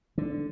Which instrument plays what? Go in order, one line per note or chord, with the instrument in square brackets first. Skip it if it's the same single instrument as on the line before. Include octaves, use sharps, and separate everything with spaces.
[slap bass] D3